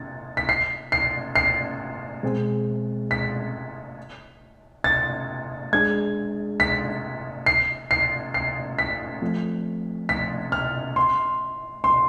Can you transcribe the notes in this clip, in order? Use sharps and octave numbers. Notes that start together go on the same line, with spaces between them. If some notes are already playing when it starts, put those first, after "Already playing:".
Already playing: A6
B6
C7
C7
C7
B2 G#3 C4 G#4
B6
A6
G#3 D4 G#4 G#6
B6
C7
C7
C7
B6
F3 A3 C4
B6
F6
C6
C6